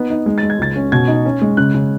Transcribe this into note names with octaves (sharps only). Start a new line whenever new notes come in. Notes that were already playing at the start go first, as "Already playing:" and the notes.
Already playing: B3 D#4
D#4
G#3
A6
G#3
G#6
C#2 A6
C#4
B2 G#6
D#4
C#4
G#3
C#3 F#6
C#3